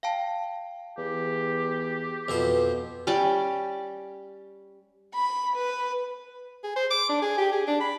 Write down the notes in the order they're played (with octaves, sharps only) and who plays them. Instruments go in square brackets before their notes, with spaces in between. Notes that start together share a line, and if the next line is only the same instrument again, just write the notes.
[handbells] F5 G5 A5
[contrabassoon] E2 [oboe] G4
[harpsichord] F2 B2 C5 [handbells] B4
[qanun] G3 C#4 D5 G5
[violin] B5
B4
[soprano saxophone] G#4
C5
D6
D4
G#4
G4
G#4
D4
B5